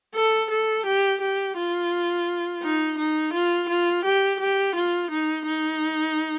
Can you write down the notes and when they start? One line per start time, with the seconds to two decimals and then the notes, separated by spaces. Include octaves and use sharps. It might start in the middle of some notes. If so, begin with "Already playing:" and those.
0.15 A4
0.50 A4
0.86 G4
1.21 G4
1.56 F4
2.63 D#4
2.98 D#4
3.34 F4
3.69 F4
4.04 G4
4.40 G4
4.75 F4
5.10 D#4
5.46 D#4